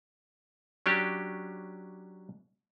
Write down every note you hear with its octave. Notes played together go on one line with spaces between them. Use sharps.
F#3 C#4 D4 G4